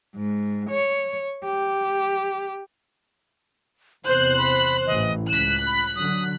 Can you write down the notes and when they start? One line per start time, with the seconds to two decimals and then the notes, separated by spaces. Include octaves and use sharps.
0.15 G#2
0.70 C#5
1.45 G4
4.06 E2 C3 C5 F#6 G6
4.38 B5
4.87 A1 E3 D#5
5.29 C#2 F#6 B6 E7
5.67 B5
5.96 D3 F#3 D#6